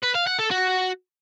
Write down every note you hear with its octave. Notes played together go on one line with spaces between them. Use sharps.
B4
F5
F#5
A4
F#4